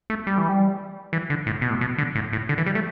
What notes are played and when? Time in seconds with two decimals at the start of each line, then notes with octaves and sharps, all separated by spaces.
0.10 A3
0.27 G3
0.38 E3
0.49 G3
1.13 E3
1.30 D3
1.47 A2
1.61 B2
1.70 A2
1.81 B2
1.98 D3
2.15 A2
2.33 A2
2.49 D3
2.58 E3
2.66 G3
2.75 A3